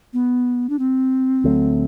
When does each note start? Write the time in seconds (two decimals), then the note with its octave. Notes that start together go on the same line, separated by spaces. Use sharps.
0.13 B3
0.69 D4
0.79 C4
1.44 D2 D3 F#3 A3